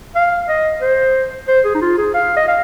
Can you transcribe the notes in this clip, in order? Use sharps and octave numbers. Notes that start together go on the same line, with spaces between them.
F5
D#5
C5
C5
G#4
D#4
F4
G#4
F5
D#5
F5